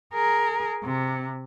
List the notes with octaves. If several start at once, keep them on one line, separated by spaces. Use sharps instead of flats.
G#4 A#4
C3